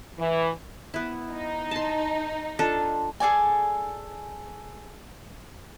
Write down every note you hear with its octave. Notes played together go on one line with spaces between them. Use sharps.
E3
B3 E4
D#4
A5 C6
D4 F4 A4
G#4 A4 D5 G#5